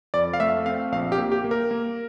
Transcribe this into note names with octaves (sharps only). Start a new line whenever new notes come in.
F2 D5
F5
A3 E5
C4 F5
A#1 F5
G4
A#3
G4
A#3
A#4
A#3